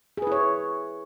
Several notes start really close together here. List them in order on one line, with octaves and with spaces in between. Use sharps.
G#4 B4 E4 C#5